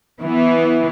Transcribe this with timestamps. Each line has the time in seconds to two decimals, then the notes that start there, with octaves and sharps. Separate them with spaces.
0.21 E3 B3